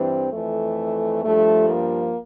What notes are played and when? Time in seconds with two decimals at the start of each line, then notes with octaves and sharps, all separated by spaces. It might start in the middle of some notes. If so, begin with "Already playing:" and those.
Already playing: G2 E3 C4
0.31 F2 E3 A3
1.23 G2 F3 A3
1.68 A#3